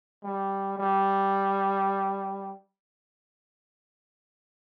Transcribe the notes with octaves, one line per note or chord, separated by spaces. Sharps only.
G3
G3